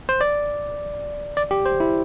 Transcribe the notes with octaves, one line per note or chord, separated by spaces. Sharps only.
C5
D5
D5
G4
C5
E4